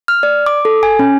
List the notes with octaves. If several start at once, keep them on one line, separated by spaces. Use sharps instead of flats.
F6
D5
D6
A4
G#5
C#4